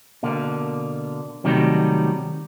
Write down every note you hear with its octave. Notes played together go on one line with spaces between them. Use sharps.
B2 D3 A#3
C3 D#3 F#3 G3 A3